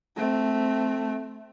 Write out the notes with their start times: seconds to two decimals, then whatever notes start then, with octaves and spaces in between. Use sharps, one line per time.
0.16 A3 C4